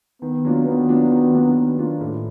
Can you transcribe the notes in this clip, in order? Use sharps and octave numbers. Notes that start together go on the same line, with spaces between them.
D#3 B3
F#3 A#3 D4 F4
D#3 B3
F#3 A#3 D4 F4
D#3
F#3 A#3 D4 F4
D#3
F#3 A#3 D4 F4
A2